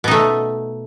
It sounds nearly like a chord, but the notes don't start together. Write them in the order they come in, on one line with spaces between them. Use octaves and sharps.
B2 D#4 A3